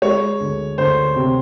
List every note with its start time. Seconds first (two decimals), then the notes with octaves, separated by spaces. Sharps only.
0.02 G#3 C#5
0.40 D2
0.78 D2 C5
1.16 C3